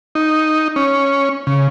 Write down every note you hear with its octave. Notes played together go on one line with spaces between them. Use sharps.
D#4
C#4
C#3